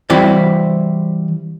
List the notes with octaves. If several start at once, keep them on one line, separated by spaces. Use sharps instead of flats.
E3 G3 C4 E4 F#4 D5